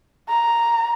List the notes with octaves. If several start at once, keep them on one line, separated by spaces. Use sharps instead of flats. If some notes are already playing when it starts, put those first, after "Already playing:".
A#5